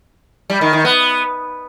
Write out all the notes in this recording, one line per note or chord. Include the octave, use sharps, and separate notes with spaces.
G3
D#3
D#3
B3